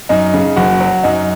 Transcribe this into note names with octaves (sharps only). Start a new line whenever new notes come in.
F#2 D#4
C#3
F#1 F#4
F#3
F#2 D#4